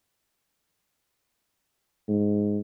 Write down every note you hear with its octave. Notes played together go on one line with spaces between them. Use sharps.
G#2